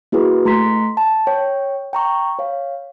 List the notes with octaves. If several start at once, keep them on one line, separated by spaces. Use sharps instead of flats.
A#3 E4 F#4 G#4 B4
A3 A#5 C6 B6
A5
C#5 G5
G5 A#5 C#6
C#5 F5